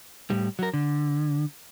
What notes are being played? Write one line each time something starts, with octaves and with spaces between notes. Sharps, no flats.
A2 G3
F#3 A#4
D3